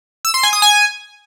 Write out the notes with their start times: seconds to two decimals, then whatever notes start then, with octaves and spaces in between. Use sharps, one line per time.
0.25 E6
0.34 C6
0.43 G#5
0.53 D#6
0.62 G#5